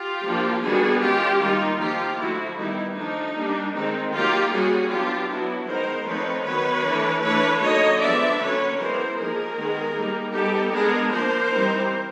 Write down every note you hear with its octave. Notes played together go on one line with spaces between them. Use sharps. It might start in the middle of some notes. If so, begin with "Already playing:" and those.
Already playing: F4 G4
F3 A#3 D4
D#3 G3 B3 D4 F#4 G#4
G#3 C#4 F4 G4
D#3 G3 A#3 D#4 F4
F3 A#3 D#4 F4 G4
D3 F3 A3 E4 F#4
D#3 G3 B3 D#4 E4
F3 A3 D4 D#4
G3 A#3 D4
D#3 G#3 C4 D#4
F#3 A#3 D#4 F4 G4
G3 A#3 C#4 F#4 G#4
F#3 B3 D4 F4 G4
F#3 B3 D4 E4 F#4
D#3 G#3 B3 D#4 A#4 C5
F3 A3 C4 D#4 B4 C#5
D#3 F#3 B3 B4 C#5
E3 A3 D4
E3 A3 D4 B4 C#5
D3 F#3 A#3 D#4 C#5 D#5
F3 G#3 B3 D4 D5 E5
D3 F#3 A#3 C#4 B4 C#5
E3 G#3 B3 A#4 C5
F3 A#3 D#4 G#4 A#4
D#3 G#3 B3
G3 A#3 D#4
G3 B3 D#4 G4 A4
G#3 B3 D4 G#4 A#4
F3 A#3 D4 A#4 C5
E3 G3 C4 D#4